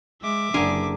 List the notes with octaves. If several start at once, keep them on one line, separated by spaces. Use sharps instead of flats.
G#3 E5 D6
F#1 D3 D4 G#4 A#4